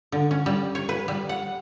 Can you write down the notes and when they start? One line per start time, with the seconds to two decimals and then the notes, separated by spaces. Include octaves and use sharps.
0.12 D3
0.31 C#4
0.46 G3
0.75 C#5
0.89 B4
1.08 G3
1.29 F#5